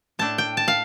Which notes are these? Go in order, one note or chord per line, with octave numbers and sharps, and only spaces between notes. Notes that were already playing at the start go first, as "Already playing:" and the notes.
A2 A3 D4 A5
G5
A5
F5